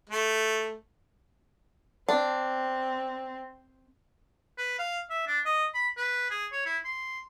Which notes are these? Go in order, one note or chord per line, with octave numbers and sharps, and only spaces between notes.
A3
C4 D4
B4
F5
E5
D4
D#5
B5
B4
G#4
C#5
E4
C6